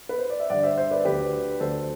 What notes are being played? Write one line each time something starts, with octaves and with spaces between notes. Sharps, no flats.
B4
C5
D5
E5
G2 D3 D5 F#5
C5 E5
C5 E5
B4 D5
D2 D3 G4 B4
D2 D3 A4 C5